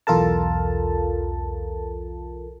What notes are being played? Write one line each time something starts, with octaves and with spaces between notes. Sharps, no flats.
B1 E2 F4 A4 A#4 A5